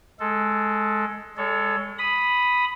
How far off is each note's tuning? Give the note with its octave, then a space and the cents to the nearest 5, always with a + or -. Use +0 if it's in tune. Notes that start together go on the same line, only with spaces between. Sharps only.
G#3 +20 A4 +0
G#3 -25 A4 +0 C#5 +25
B5 +0 D#6 +0